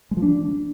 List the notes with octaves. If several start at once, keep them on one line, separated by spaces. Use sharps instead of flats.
G#3
F3
D4